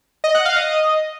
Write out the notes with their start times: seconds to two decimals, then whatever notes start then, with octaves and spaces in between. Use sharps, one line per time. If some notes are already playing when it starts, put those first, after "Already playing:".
0.24 D#5
0.35 F#5
0.45 F5
0.56 D#5